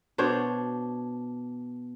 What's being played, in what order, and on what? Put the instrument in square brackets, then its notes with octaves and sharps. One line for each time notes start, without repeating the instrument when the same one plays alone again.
[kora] B2 D4 C5 C#5